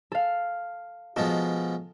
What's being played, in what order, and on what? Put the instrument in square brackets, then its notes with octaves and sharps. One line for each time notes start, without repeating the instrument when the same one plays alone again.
[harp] A4 F5
[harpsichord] B2 F3 G#3 [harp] A4